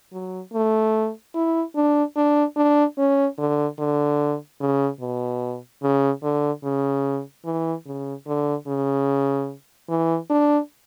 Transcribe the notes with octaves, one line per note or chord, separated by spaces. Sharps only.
F#3
A3
E4
D4
D4
D4
C#4
D3
D3
C#3
B2
C#3
D3
C#3
E3
C#3
D3
C#3
E3
D4